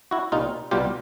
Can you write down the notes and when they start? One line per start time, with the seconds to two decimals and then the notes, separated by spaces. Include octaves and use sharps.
0.11 E4 F#4
0.32 C2 A#2 G3 D#4 F4
0.71 C2 B2 G3 F4 G4